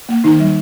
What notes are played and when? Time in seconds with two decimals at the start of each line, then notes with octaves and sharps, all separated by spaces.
0.09 A#3
0.24 D#3 D#4
0.40 G3